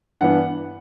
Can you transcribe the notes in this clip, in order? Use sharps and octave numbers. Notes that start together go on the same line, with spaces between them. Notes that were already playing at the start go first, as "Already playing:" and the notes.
G2 E3 B3 D4 F#5